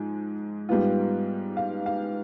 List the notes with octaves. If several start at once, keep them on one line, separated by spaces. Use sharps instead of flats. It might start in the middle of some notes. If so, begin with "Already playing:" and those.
Already playing: G#2 F3 G#3
G#2 G3 B3 F4
F5
F5